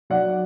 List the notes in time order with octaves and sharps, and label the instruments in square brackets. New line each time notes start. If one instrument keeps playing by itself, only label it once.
[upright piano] F#3 D5 F#5